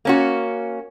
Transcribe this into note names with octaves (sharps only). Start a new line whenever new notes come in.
A#3 C#4 F#4